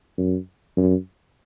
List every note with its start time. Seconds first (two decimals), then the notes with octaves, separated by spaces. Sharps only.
0.18 F#2
0.77 F#2